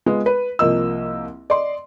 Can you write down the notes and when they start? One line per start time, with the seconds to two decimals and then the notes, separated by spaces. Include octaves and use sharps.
0.06 G#3 B3 F4 G#4
0.26 B4
0.59 C2 F3 A#3 F4 D#5 E6
1.50 D5 D#5 C6